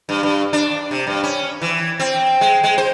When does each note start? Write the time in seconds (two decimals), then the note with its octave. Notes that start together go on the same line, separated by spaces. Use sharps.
0.09 G2
0.23 G2
0.53 D4
0.91 C3
1.07 G2
1.24 C#4
1.62 E3
2.00 C4
2.41 G#3
2.64 G#3
2.78 C5